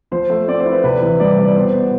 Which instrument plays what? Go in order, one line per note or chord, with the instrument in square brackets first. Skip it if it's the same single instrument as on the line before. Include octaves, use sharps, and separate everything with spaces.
[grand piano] F3 C5
A3
C4 D5
C5
E4
B4
C3 B4
E3
G3 D5
C3
D5
B2 C5
B3